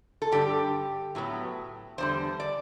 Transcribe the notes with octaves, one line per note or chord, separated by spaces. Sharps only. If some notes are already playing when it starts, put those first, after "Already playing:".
A4
G2 D3 G3 G4
A2 F#3 B3
E2 D3 G3 C5
D5